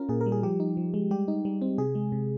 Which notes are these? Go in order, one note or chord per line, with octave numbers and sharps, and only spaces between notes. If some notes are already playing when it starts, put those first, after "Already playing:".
Already playing: C#4 F4 A#4
A#2 G#4
A#4
G3
G#4
F3 G4
D#4
F3
G#3
G3 G4
D#4
G3
C4
C3 G#4
G#3
C3